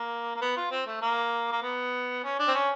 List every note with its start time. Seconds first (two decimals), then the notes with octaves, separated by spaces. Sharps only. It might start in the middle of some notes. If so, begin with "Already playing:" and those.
Already playing: A#3
0.36 A#3
0.42 B3
0.57 F4
0.71 C4
0.87 A3
1.02 A#3
1.52 A#3
1.63 B3
2.24 C#4
2.39 D4
2.48 C4
2.54 C#4